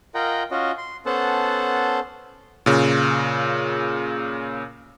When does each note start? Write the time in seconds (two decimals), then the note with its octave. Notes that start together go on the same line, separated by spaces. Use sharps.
0.15 F4 A#4 D#5 F#5 G5
0.51 C#4 F4 F#4 D#5
0.78 C6
1.06 B3 C#4 A4 C5 F#5 A5
2.66 A#2 C#3